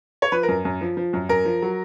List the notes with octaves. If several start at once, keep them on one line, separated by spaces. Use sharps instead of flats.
C#5
F3 B4
A#4
F#2
F#2
F3
F3
F#2
F#2 A#4
F3
F#3